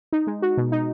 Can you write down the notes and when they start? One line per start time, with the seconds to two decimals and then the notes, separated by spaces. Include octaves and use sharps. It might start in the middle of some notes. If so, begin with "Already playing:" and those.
0.13 D#4
0.27 G#3
0.42 F#4
0.57 B2
0.72 D#4